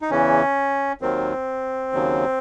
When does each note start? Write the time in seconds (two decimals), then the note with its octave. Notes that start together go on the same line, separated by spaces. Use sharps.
0.02 D#4
0.10 E2 C#3 E3 C#4
1.01 D#2 D#3 F#3 C4
1.92 D#2 C#3 F#3